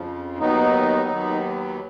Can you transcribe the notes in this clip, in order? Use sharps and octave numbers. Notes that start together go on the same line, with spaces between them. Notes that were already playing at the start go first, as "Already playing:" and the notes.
Already playing: F2 C#3 F3
D#2 D#3 F#3 B3 D#4
D#2 D#3 F#3 B3